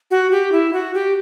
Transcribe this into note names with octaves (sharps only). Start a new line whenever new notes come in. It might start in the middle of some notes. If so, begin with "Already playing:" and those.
F#4
G4
E4
F#4
G4